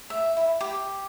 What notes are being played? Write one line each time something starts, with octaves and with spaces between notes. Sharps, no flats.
E5
E4
G4